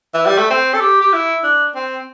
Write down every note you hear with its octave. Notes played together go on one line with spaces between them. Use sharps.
E3
G3
A3
C4
A4
G4
G4
E4
D4
C4